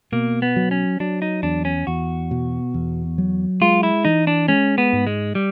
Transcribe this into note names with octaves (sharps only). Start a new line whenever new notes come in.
B2 A#3
B3
F#3
C#4
F#3 D4
D#4
E2 D4
C#4
E2 F#4
B2
E2
F#3
G#3 F4
E4
E3 D#4
D4
G#3 C#4
B3
G#2
G#3
G3